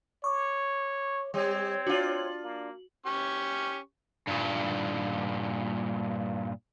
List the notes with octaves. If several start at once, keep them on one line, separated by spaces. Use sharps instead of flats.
C#5 C#6 D6
G3 C4 C#5
D4 F4 F#4 F#7
A#3
C#4 G4 C#6
G2 A#2